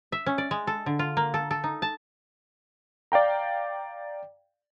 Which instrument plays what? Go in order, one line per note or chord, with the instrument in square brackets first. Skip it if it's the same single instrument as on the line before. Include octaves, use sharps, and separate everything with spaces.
[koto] E5
C#4
D5
G#3
A4
D3
F4
A#3
A4
A4
D#4
A5
[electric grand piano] D5 F5 G5 A#5